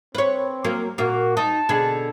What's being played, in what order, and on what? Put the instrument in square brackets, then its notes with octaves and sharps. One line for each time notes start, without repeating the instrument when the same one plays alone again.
[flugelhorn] C4 [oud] B4 C#5
[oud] F#3 A#3
[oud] A#2 A#3 [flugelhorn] F#4
[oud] D#4 [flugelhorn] A5
[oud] B2 D3 G#4